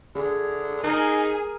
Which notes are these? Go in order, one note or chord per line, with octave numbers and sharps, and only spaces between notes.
D3 G#4
D#4 G#4 A#4